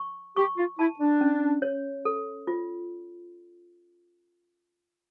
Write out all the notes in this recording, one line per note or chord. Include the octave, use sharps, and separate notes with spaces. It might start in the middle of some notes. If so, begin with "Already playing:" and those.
Already playing: C#6
G4 C#6
F4
E4 A5
D4
C#4
C#5
A4
F4